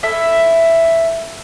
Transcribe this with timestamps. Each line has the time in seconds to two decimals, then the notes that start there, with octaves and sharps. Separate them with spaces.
0.03 E4 A4 E5